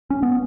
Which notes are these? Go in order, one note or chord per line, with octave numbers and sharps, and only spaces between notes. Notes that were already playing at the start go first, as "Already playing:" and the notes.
C#4
B3